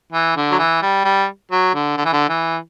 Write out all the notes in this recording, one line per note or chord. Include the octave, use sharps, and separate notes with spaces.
E3
D3
F#3
E3
G3
G3
F#3
D3
D3
E3
D3
E3